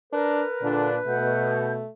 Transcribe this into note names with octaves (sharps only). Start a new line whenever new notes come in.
D4 A#4 B4
A#2 D3 D4
B2 A3 F#5 G6